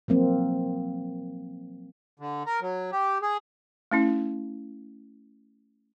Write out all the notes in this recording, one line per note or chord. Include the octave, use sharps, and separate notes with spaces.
F3 F#3 A#3 C4
D3
A#4
F#3
G4
G#4
A3 C#4 E4